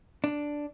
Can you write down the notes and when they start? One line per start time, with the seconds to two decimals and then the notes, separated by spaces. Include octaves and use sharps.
0.24 D4